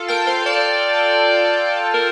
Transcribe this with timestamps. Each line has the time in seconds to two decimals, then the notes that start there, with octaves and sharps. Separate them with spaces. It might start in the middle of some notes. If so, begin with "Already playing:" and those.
Already playing: F4 A4
0.08 A#4 G5
0.27 C5 F5
0.46 D5 A5
1.94 A#4